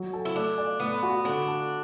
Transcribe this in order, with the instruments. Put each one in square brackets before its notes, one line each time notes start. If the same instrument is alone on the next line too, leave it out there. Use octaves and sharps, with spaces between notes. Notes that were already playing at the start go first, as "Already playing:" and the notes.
Already playing: [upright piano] F#3
A4
[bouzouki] E4
[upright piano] A3 [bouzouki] D4
[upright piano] D5
[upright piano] A2 [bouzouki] B3
[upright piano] F#4
[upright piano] D3 [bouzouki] D4
[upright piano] A4